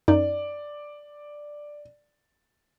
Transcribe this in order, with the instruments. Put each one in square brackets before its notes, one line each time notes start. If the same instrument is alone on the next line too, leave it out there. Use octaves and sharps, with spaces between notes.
[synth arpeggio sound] F#2 D#4 [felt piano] D5